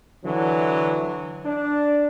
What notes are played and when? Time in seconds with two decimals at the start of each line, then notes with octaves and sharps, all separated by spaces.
0.24 D3 E3 F#3
1.45 D4